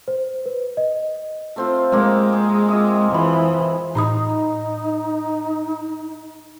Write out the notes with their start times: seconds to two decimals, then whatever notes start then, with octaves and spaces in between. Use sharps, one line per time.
0.08 C5
0.46 B4
0.77 D#5
1.56 A3 C4 F4
1.92 G#3 A#3 C4
2.33 G#4
2.69 F4 D#5 E5
3.11 E3 F3 B5
3.95 A2 D#4 B5 D#6